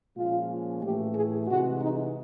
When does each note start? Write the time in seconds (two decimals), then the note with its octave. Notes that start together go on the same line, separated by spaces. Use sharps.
0.16 A#2 F3 G#3 C#4 F4
0.82 A2 E3 A3 G4
1.14 G#4
1.47 C3 E3 G#3 F#4
1.80 D#4